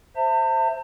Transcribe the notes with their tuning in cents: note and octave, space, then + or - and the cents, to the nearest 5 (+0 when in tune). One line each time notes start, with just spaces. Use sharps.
C5 +0 E5 +0 A5 +45